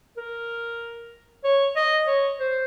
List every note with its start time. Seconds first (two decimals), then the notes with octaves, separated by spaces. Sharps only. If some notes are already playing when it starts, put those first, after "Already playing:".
0.17 A#4
1.44 C#5
1.76 D#5
2.07 C#5
2.40 C5